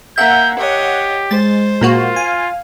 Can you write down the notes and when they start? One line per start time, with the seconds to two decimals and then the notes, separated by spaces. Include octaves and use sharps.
0.18 A#3 E5 F#5 G6
0.58 G4 C#5 D#5
1.31 G#3 C5 A6
1.81 A#2 A#3 F4 F#4
2.16 F5 G#5